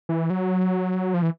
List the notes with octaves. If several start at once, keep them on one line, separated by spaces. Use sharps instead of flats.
E3
F#3
F3
E3